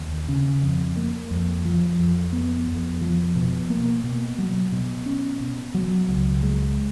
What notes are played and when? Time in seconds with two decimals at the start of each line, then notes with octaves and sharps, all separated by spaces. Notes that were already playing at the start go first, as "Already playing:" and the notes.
Already playing: D#2
0.28 C#3
0.63 F2
0.96 A#3
1.31 F2
1.65 F3
1.99 F2
2.33 B3
2.67 F2
3.01 F3
3.35 B2
3.70 A#3
4.04 B2
4.38 F#3
4.72 B2
5.06 C#4
5.40 B2
5.74 F#3
6.09 C#2
6.43 G#3